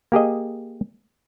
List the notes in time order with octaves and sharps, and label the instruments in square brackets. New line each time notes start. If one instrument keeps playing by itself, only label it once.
[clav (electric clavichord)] A#3 G4 G#4 D#5